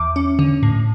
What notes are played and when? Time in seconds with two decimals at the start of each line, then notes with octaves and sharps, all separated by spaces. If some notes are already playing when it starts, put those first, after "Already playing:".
Already playing: E2 D6
0.16 C#4
0.39 D3
0.63 A2